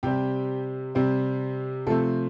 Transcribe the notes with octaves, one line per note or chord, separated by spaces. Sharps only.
C3 G3 C4 G4
C3 G3 C4
C3 F3 A3 C4 A4